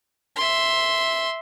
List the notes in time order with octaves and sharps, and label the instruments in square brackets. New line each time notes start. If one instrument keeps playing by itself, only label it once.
[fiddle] E5 C6